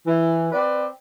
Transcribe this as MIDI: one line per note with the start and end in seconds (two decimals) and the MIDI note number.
0.07 0.48 52
0.52 0.86 60
0.52 0.86 71
0.52 0.86 74